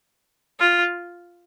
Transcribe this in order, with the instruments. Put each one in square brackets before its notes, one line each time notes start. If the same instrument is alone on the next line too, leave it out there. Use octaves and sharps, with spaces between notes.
[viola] F4